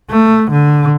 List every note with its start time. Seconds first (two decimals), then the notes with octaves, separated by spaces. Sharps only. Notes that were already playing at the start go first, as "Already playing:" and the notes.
0.10 A3
0.51 D3